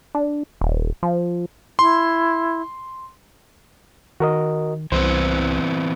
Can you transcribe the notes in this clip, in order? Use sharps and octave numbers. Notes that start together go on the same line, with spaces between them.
D4
D#1
F3
E4 C6
D#3 F#4 A#4 D#5
C2 E3 B3 C4 C5